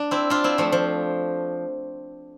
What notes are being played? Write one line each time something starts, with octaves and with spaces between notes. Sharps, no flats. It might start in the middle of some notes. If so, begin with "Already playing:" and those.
Already playing: D4
C4 E4
D4 F4
C4 E4
F3 A3
F3